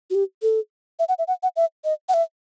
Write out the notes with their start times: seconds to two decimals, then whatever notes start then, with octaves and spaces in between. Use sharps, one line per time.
0.10 F#4
0.15 G4
0.42 A4
0.99 E5
1.09 F#5
1.19 E5
1.28 F#5
1.43 F#5
1.56 E5
1.84 D#5
2.09 F#5
2.14 E5